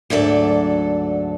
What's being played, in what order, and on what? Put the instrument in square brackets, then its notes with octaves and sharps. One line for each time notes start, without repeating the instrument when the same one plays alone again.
[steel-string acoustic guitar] D2 G#2 F#3 A4 D5